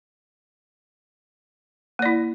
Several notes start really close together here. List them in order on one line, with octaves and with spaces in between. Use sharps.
A#3 D5 E4